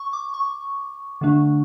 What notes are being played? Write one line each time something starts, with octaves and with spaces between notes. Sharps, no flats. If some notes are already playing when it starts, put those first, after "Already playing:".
Already playing: C#6
D6
C#6
D3 A3 D4